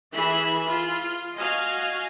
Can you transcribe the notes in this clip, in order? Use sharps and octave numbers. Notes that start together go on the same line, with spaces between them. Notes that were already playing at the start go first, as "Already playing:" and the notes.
E3 G#4 E5 B5
F4
F#4 D#5 F5 G#5